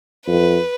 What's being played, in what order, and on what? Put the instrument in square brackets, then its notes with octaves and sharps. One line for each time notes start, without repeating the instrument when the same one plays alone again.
[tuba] F2 [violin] B4